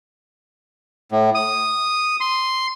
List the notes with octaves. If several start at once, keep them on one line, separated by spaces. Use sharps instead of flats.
A2
D#6
C6